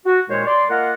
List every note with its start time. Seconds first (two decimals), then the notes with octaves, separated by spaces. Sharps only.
0.06 F#4
0.29 D#2 A#2 G#3 F4 C5 C#5
0.46 D5 C6
0.70 A#3 F4 A#4 D#5 F5 F#5